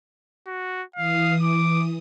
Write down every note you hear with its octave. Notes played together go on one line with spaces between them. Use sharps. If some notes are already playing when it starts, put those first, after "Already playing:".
F#4
E3 F5 D#6
D6